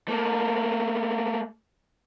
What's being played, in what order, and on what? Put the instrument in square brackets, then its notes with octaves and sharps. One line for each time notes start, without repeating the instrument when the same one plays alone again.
[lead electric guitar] A3 A#3